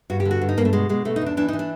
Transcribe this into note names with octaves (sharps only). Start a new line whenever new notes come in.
G2 F#4
G4
D3
F#4
G2
D#4
G2 A#3
A3
B2 G#3
B2 G#3
B2 A3
D#4
E2 D4
E3 D4
E3 D#4
D4